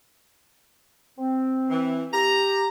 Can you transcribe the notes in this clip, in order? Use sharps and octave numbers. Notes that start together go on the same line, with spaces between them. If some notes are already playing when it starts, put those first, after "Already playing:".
C4
E3
G4 A#5